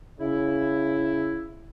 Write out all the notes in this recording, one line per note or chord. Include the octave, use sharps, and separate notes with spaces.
C#3 E4